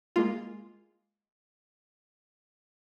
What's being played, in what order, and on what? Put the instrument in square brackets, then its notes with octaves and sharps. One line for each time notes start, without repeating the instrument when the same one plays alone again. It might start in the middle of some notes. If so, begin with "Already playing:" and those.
[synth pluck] G#3 A#3 F4